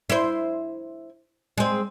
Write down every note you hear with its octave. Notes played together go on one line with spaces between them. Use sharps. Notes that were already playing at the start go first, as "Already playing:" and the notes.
E4 C5
G#3 C4